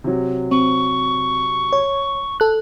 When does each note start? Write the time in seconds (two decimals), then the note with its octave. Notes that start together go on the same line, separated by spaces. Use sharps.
0.04 C3 F#3
0.51 C4 C#6
1.73 C#5
2.40 A4 F#6